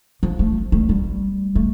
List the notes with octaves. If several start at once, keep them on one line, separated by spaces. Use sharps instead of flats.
F3
A3
A3
G3
A3